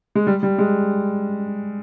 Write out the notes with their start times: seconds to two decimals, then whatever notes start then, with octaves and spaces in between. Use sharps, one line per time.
0.15 G#3
0.27 G3
0.43 G3
0.59 G#3